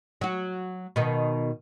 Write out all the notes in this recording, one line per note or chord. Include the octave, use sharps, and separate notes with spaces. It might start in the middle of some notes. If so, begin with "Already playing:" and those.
F#3 F#4
B2 D#3